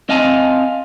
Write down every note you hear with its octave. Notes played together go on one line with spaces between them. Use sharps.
C4 D#5 F5 G#5 A5